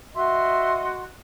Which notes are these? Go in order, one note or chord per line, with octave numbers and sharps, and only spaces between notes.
F#4 D#5 E5 C6